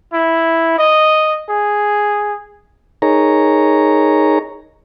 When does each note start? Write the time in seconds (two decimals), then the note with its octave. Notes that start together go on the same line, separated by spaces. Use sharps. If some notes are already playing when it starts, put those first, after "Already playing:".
0.13 E4
0.78 D#5
1.50 G#4
3.02 D#4 G#4 A#4 C#5 A#5